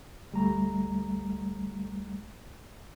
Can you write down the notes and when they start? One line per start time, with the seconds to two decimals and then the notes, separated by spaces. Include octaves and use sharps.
0.33 D2 G3 A3 A#5